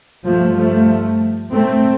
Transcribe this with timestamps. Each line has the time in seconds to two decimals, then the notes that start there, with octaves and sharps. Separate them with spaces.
0.24 G2 F3 A3
0.56 F3 A3
1.52 A3 C4